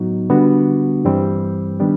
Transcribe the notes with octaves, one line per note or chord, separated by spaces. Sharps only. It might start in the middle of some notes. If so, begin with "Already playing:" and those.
Already playing: A2 F#3 B3 D#4 F#4
D3 G3 B3 D4 F#4
G2 E3 G3 C4
D#3 G3 B3 D4